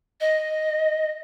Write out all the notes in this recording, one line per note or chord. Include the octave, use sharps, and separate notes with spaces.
D#5